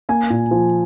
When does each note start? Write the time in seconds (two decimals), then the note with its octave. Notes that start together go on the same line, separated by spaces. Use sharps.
0.09 A#3 G#5
0.30 A#2
0.51 F3